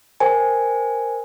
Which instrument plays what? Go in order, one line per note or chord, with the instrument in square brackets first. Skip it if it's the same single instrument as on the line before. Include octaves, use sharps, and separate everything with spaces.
[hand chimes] A#4 C5 G5 G#5